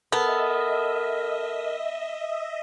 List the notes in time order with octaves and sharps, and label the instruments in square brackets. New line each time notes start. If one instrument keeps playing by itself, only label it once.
[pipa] B3 [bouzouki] A4 [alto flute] A#4 [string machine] D#5 E5